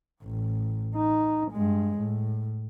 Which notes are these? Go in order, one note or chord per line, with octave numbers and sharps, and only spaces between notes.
A1
D#4
G2 G#3
A2